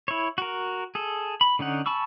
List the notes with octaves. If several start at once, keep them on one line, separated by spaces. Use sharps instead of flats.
E4 C#5
F#4 A#4
G#4 A4
B5
D3 C#4 D#4 F#5
G#5 A5 B5 C#6 E6